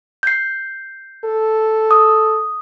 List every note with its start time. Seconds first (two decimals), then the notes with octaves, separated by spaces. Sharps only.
0.23 G6 C7
1.25 A4
1.91 D#6